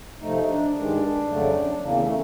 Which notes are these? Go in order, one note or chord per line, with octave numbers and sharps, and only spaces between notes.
C3 F3 A3 D#4
D4
G2 D#3 G#3 D4
F2 C#3 F#3 A3
E2 C#3 E3 A#3
A3